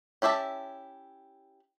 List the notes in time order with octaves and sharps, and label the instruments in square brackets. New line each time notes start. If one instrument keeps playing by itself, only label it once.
[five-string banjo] C#4 E4 G4 E5 A5